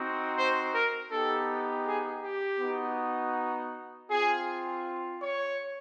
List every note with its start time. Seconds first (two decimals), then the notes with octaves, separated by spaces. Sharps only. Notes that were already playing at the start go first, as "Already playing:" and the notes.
Already playing: C4 D#4 F#4
0.36 C5
0.72 A#4
1.10 B3 D#4 G4 A4
1.85 G#4
2.22 G4
2.59 B3 D#4 F#4
4.09 C4 F4 G#4
5.21 C#5